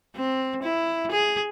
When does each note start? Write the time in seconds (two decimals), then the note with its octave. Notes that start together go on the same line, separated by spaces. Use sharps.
0.16 C4
0.63 E4
1.12 G#4